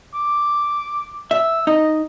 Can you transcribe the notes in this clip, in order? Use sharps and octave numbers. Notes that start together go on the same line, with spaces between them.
D6
E5 E6
D#4 D#5